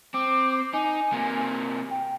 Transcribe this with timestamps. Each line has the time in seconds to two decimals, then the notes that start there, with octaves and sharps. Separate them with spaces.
0.14 C4 D6
0.73 D#4 G#5
1.12 C3 A#3
1.91 G5